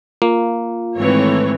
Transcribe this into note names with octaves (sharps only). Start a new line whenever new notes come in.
A#3 F4
G#2 D#3 E3 A3 C4 C#5